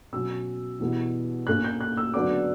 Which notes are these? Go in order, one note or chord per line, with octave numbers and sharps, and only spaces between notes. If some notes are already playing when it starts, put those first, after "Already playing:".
B2 F#3 C#4 E6
E2 B2 G3 B3 E4
A#2 A#3 C#4 F#6
G6
F#6
E6
D2 C#3 F#3 B3 D4 D6